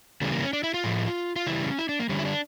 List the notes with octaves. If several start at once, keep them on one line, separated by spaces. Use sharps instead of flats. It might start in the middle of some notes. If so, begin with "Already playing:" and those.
C#3 E3 G3 A3
A#3
C#4
D4
E4
F4
A2 F3 A3
F4
C#3 E3 G3 E4
C#4
E4
D4
A#3
D3 G3 C#4
E4
D4